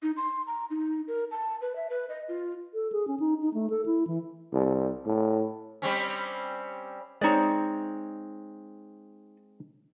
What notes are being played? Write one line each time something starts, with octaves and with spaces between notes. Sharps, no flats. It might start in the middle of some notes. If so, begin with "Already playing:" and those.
D#4
C6
A#5
D#4
A#4
A5
B4
E5
B4
D#5
F4
A4
G#4
C#4
D#4
D#4
A3
A4
E4
E3
C2
A2
G3 C4 C#4
G#3 C4 D#4 C#5 D5